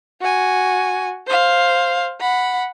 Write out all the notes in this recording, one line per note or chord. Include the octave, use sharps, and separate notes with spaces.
F#4 G#5
C5 F5
F#5 B5